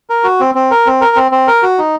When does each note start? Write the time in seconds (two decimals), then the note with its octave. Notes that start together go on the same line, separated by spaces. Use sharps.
0.10 A#4
0.24 F#4
0.40 C4
0.55 C4
0.71 A#4
0.86 C4
1.01 A#4
1.16 C4
1.32 C4
1.47 A#4
1.63 F#4
1.78 D#4